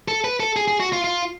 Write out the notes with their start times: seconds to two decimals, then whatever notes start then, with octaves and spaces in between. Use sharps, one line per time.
0.08 A4
0.24 B4
0.40 A4
0.56 G#4
0.68 G#4
0.80 F#4
0.92 F4
1.04 F4